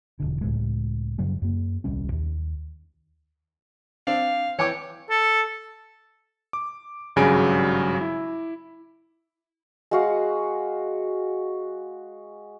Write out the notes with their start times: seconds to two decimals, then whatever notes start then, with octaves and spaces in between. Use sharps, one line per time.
0.20 E1 A#1 D3
0.41 C#2 A2 G#3
1.19 F#2 C#3 F#3 G3
1.42 F#2 A#3
1.84 D#1 C2 G3 C#4
2.12 D#2
4.07 C4 D4 F5
4.59 E3 C#5 G5 D6
5.10 A4
6.53 D6
7.16 G#1 G2 C#3 F#3 G#5 D7
8.01 E4
9.91 G#3 F#4 F5